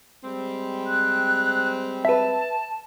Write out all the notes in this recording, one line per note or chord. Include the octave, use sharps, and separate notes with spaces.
G3 G#3 C4
F#6
B4 E5 A5